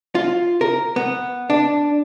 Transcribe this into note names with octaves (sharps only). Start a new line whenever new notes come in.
F4
A#4
B3
D4